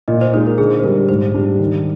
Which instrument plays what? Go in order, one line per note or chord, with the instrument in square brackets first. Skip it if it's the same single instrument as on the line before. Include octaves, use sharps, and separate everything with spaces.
[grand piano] A#2 [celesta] D#5
[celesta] C5
[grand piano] G#3 D#4 [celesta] C5
[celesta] A#4
[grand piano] D3 [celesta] G#4
[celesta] C5
[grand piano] G3 D4 [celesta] A#4
[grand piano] G#2 [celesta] C5
[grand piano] G3 D4
D#3